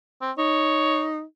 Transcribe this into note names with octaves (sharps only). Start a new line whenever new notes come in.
C4
D#4 C#5